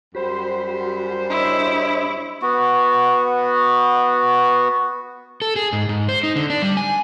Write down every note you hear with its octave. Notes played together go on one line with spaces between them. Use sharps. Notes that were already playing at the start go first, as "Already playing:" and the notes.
F#2 G3 F#4 G4 C5 B5
D4 E4 C#5 D#5
B3 F#4
A4
G#4
G#2
G#2
C5
D#4
D3
D4
G3
G#5